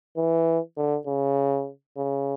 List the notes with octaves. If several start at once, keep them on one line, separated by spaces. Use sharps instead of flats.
E3
D3
C#3
C#3